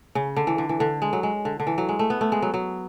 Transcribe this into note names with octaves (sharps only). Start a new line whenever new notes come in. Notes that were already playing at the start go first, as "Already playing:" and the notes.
C#3
D3
E3
D3
E3
D3
G#3
F#3
G#3
D3
D3
E3
F#3
G#3
A3
B3
A3
G#3
F#3
F#3